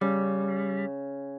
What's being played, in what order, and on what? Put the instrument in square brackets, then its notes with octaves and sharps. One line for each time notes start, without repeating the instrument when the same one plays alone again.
[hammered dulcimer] C#3 [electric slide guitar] G3